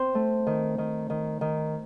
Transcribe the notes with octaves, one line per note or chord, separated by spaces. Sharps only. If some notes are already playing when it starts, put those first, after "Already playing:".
Already playing: C4 C5
A3
D#3
D#3
D#3
D#3